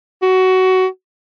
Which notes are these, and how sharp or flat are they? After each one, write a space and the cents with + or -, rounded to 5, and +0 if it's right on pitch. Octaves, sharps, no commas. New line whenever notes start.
F#4 +15